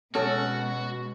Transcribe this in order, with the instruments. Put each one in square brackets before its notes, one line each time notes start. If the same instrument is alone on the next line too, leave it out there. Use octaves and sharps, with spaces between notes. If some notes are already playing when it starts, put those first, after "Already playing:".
[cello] B2 G#3 [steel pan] C#4 A4 [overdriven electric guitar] F#4